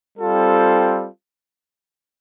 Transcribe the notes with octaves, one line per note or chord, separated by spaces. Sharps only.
G3 C4 F4 A4